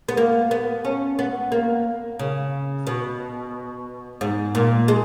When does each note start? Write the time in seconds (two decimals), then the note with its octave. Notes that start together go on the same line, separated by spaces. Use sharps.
0.09 B3
0.17 A#3
0.51 B3
0.85 C#4
1.19 B3
1.52 A#3
2.19 C#3
2.87 B2
4.21 G#2
4.55 A#2
4.88 G#3